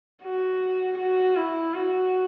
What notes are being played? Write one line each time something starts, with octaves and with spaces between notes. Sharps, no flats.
F#4
F#4
E4
F#4